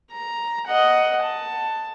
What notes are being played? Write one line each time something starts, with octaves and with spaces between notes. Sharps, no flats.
A#5
D#5 F#5
A5